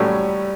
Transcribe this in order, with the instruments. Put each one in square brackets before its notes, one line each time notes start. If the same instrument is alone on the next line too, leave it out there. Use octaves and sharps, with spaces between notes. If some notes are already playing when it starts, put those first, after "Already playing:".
Already playing: [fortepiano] A2 F#3 A3 C#4 [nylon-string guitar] G3